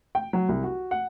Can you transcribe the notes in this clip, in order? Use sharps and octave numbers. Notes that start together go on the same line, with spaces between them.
G5
F#3
C2
F#4
F#5